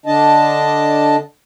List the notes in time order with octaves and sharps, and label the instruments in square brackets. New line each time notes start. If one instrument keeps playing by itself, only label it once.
[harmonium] D3 D4 D#5 A5